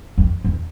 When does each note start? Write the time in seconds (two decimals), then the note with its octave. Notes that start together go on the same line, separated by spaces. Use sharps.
0.18 F2
0.44 E2